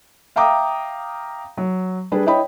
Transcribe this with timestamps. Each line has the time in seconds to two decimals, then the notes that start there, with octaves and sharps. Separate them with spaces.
0.36 E5 F5 G5 A#5 D6 D#6
1.57 F#3
2.12 G3 D4 G#4 B4
2.26 E4 C#5 D#5 G5 B5